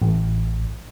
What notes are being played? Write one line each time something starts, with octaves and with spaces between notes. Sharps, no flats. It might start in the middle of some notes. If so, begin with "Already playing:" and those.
A1